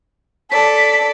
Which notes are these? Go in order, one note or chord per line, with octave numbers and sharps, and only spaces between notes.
A4 D5 B6